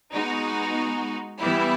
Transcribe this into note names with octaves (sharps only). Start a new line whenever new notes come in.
G#3 B3 D#4 F#4
E3 G3 B3 E4